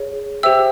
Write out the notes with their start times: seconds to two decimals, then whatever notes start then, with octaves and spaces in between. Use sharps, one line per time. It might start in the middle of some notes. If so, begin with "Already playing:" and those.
Already playing: G#4 C#5
0.43 G4 C5 E5 G5 E6